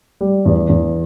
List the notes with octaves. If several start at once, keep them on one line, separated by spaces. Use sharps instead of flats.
G3
E2
E2